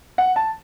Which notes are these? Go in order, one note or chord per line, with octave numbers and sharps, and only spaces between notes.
F#5
A5